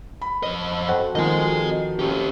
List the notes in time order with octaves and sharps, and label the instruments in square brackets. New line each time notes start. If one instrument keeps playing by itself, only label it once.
[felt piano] B5
[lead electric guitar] F2 D#5
[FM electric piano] C4 F#4 A4
[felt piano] D#3 F3 [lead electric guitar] D#5 G#5
[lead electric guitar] C#4 G4